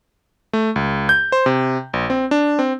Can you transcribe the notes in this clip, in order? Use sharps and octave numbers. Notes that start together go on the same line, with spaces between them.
A3
C#2
G6
C5
C3
A#1
C4
D4
C4